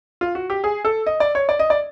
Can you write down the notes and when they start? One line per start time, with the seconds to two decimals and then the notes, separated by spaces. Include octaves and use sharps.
0.21 F4
0.35 F#4
0.50 G4
0.64 G#4
0.85 A4
1.06 D#5
1.20 D5
1.35 C#5
1.49 D5
1.59 D#5
1.70 D5